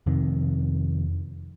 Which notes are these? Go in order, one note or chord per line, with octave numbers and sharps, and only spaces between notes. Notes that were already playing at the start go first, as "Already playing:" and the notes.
F1 F2 C3 D#3